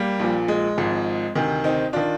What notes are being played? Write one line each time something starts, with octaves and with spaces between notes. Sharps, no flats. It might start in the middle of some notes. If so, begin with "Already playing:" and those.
Already playing: G3 A#3
A#1 A#2 F3
G#3
G#1 G#2 F3
D2 C3 D#3
C4 D#4
D#3 D4 F4